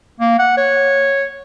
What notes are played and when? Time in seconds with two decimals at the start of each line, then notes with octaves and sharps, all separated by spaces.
0.20 A#3
0.39 F#5
0.57 C#5